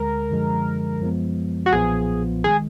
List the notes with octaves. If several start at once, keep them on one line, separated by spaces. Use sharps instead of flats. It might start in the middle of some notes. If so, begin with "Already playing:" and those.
Already playing: D2 D3 G#3 A#4
F#2 D3 F3 G#3
F#2 F3 G#3 B3
F#4
B1 A#2 F3 B3 F4 G#4
D#3 G#3 G#4